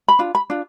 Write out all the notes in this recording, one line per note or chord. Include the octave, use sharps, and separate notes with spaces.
B5
D4 F4
B5
D4 F4